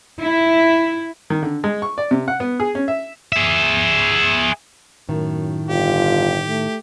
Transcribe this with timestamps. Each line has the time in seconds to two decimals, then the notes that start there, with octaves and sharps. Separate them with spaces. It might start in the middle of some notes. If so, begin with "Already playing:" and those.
0.21 E4
1.30 D#3
1.43 D3
1.64 G#3
1.82 C#6
1.98 D5
2.11 C3
2.28 F#5
2.40 B3
2.60 G#4
2.75 C#4
2.88 E5
3.32 G#4 E5
5.09 F#2 A2 D#3
5.68 G1 F4 G4
6.48 A3